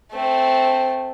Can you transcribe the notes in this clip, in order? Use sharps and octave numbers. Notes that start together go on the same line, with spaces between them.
A3 C4